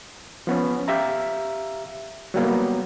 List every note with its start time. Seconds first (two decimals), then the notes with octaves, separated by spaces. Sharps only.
0.47 F3 B3 C#4
0.88 G4 E5 F5 A#5
2.34 F#3 G3 A#3 B3